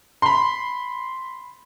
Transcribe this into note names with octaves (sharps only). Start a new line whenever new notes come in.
B5 C6